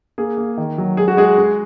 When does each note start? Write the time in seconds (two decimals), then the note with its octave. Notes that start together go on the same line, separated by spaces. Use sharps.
0.18 A#3 G#4
0.38 A#3
0.58 D#3
0.78 F#3
0.97 G#3 G#4
1.08 F#4
1.17 G#3 G#4
1.38 G#3